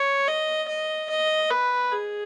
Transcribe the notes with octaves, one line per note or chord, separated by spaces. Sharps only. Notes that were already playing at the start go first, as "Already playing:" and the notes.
Already playing: C#5
D#5
D#5
D#5
B4
G#4